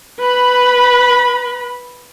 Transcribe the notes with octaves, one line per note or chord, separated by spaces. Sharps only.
B4 B5